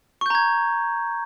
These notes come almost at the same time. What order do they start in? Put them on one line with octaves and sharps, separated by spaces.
C#6 G6 A#5 G#6